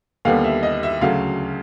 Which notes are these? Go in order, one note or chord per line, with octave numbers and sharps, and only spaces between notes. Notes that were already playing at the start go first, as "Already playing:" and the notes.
D#2 D3 G3 B3 F5
E5
D#5
E5
D2 C#3 F#3 F5